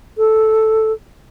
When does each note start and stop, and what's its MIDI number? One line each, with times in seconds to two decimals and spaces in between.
0.18 0.93 69